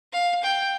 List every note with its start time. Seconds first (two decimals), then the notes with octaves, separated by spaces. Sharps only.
0.13 F5
0.43 G5